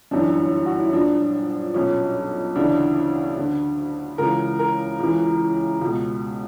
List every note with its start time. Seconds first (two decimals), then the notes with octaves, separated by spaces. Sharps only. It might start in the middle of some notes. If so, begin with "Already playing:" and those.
0.11 G1 F#2 E3 D4
0.66 F#4
0.80 E4
0.93 A#1 A#2 D4
1.74 B1 A#2 C#4
2.55 D2 C#3 E3 D4
3.37 D2 D3
4.18 C#2 C#3 E3 A#4
4.59 A#4
5.00 C#2 C#3 E3
5.81 C#2 B2